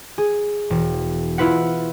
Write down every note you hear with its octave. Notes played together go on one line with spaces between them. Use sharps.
G#4
E1
E4 F4 B4 F#5